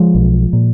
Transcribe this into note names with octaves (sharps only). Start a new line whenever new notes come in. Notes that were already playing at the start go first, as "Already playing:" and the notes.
Already playing: F3 G#3
B1
A#2